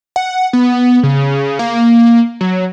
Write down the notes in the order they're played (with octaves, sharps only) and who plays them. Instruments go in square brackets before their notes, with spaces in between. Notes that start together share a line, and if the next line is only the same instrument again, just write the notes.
[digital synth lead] F#5
B3
C#3
A#3
F#3